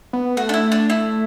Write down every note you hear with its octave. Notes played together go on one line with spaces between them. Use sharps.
B3
A3 F#4
D4
E4
D4
E4